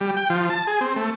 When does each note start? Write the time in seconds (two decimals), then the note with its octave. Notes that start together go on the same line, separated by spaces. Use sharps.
0.01 G3
0.17 G5
0.30 F3
0.50 A5
0.67 G#4
0.81 C4
0.96 A3